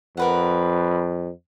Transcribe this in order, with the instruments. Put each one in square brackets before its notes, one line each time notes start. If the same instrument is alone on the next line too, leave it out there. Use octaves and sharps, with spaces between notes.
[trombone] F2 [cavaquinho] A#4 B4 F#5